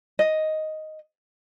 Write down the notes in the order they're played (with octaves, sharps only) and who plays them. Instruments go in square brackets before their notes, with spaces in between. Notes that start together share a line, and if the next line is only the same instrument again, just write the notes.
[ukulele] D#5